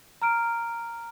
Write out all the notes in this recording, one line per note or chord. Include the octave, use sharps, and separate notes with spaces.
A#5 F6 D7